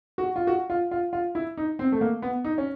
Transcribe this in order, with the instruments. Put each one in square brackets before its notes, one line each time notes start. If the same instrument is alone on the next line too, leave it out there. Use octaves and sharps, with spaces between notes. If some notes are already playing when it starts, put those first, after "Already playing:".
[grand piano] F#4
F4
F#4
F4
F4
F4
E4
D#4
C4
A3
A#3
B3
D#4
C#4